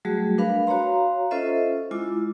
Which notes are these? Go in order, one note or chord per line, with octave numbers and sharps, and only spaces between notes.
F#3 G3 A3 F#4 G#4
D4 A#4 B4 F5 B5
F#4 C#5 F5 A#5 C6
C#4 F4 A4 C5 D#5 E5
G#3 E4 F4 D6